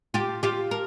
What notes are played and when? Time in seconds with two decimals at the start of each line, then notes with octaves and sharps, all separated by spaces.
0.14 F4 G4
0.43 F4 G4
0.71 A#4